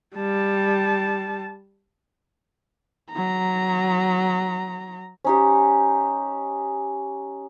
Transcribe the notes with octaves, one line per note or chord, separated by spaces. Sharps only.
G3 A5
F#3 A#5
C#4 D#4 G4